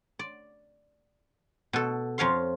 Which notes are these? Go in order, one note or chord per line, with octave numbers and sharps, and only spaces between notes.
D5
B2 A4
F2 F3 C#5 F5 C6